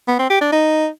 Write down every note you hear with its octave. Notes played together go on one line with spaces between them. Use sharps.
B3
C4
G4
D4
D#4